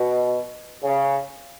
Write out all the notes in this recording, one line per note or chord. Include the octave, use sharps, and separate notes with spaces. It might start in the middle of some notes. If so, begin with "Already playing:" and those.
Already playing: B2
C#3